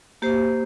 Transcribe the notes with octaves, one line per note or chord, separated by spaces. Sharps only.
A#3 G4 C5